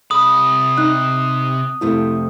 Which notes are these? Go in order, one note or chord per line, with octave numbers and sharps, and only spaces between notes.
C3 B5 D#6
D#4 F#6
F2 C3 A3 E4